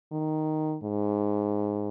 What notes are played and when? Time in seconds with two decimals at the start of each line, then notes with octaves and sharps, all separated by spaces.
0.12 D#3
0.83 G#2